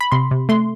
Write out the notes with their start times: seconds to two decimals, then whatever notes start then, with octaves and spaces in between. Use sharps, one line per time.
0.01 B5
0.12 C3 C6
0.31 C3
0.49 A3 C6